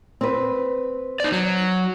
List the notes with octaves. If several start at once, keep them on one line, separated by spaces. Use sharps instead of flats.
C4 B4
D#4 D5
F#3